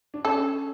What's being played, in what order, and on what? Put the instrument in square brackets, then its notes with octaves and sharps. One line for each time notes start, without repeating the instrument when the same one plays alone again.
[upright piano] D4
[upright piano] C#4 [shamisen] A4